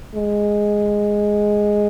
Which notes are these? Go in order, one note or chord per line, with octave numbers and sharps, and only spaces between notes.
G#3